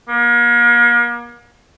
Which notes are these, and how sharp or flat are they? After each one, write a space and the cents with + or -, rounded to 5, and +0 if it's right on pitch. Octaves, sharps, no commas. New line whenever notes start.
A#3 +40